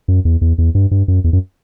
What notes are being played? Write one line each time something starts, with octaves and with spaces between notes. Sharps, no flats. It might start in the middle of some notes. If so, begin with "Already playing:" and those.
F#2
E2
E2
E2
G2
G2
F#2
E2
F#2